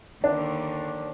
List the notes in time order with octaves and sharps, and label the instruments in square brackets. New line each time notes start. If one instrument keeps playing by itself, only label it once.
[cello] D#2 D3 [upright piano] D4